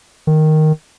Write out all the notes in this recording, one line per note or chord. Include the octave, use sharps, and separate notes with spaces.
D#3